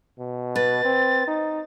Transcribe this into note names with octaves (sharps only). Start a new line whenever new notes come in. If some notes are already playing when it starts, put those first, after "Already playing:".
B2
B4 A6
C4
D#4